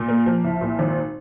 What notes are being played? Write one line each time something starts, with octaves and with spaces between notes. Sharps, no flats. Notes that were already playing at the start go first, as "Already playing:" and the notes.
Already playing: A#2
A#3
F3
C2
A#2
G#1